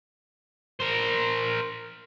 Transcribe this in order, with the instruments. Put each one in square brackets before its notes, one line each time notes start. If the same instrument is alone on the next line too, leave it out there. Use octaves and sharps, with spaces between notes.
[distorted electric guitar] A#4 C5